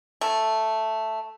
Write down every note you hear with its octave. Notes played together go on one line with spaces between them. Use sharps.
A3